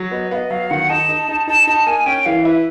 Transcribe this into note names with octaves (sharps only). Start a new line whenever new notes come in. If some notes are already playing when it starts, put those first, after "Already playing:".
Already playing: F#3
B3 D#5
B3 D#5 F5
F#3 F5
D#3 F#5
D#4 A5
D#4
D#4
D#4 A5
D#4 A5
A#3 G#5
C#4 G5
E3 F5
E4 B4